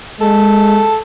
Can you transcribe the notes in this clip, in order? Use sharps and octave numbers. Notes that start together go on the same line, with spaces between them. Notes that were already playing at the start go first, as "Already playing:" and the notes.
G#3 A4